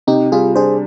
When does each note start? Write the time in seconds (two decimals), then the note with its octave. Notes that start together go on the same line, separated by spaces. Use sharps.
0.07 C3 D#4 G4
0.32 G3 F4 G#4
0.55 D4 G#4 C5